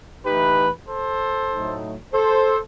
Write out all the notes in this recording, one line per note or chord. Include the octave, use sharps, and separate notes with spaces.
E3 A3 D#4 G4 B4
A4 C5
A2 F#3 A3 D#4
A4 C5